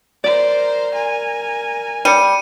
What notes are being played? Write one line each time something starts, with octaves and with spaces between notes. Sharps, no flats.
A#4 C5 D5
A#4 G#5
G3 C#7 D#7